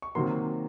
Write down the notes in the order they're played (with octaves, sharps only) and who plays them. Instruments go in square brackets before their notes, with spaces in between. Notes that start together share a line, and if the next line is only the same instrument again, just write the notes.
[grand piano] C#6
C3 D#3 F#3 A#3 C6